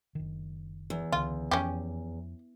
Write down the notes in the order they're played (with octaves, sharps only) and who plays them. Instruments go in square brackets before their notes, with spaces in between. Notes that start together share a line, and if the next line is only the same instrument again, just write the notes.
[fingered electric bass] F#1 D#3
[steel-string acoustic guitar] E2
[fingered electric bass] C#2 D3 [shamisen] F4
[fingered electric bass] F2 [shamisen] C#4 G4